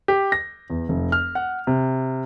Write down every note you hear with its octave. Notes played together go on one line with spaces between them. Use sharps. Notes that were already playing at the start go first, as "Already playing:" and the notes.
G4
A#6
E2
F1
F6
F#5
C3